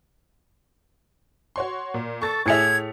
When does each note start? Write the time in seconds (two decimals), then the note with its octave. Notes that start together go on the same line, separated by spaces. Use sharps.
1.56 F#4 C#5 C6
1.94 A#2
2.22 A4 C#6 A6
2.46 A2 E4 G#4 E5 G#6 C#7 F7